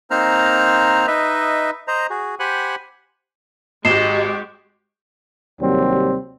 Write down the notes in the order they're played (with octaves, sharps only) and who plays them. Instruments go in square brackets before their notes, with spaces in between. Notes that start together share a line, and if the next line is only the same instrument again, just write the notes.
[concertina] A#3 C4 D#4 C5 A#5 F6
D#4 B4 D#5 E5
C5 D#5 A#5
F#4 G#4
G4 C5 F#5 G#5 B5 F#6
[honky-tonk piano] G#1 [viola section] G#3 F#4 G4 [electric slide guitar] D#5 [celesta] C7 E7
[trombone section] D#2 C3 F#3 G3 C4